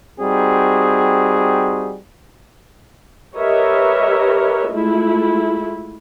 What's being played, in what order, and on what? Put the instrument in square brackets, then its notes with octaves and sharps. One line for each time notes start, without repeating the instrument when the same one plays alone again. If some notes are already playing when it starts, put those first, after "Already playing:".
[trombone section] G3 C4 D#4 F#4 G#4
[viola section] G4 A#4 B4 C#5 D#5 E5
G#3 A3 E4 F4